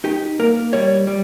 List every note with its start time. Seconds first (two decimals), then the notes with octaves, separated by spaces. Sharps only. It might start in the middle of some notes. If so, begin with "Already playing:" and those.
0.04 D#4 G4
0.39 A#3 A#4
0.73 G3 C#5
1.07 G3